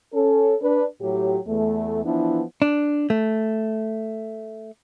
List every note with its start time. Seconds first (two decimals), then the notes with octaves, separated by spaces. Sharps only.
0.14 C#4 A4
0.62 D4 B4
1.01 A2 F#3 G4
1.47 E2 A3
2.05 E3 F3 B3 D4 E4
2.62 D4
3.10 A3